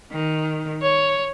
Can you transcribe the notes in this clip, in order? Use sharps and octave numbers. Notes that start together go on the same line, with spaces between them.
D#3
C#5